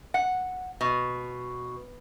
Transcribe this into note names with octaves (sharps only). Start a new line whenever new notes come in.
F#5
B2